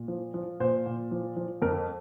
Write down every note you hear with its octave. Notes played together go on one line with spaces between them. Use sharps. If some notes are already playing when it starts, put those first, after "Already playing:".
Already playing: A#2
F3
F3
A#2 C5
A#2
F3
F3
F2 A#4